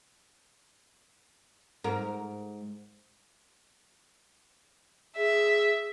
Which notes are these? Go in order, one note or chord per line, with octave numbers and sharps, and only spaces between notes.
G#2 A#4
G#4 E5